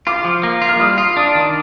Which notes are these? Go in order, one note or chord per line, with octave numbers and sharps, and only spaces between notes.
F4 D6
F3
A#3
F4
F6
G3 D#6
F4 D#6
D4 D#6
D#3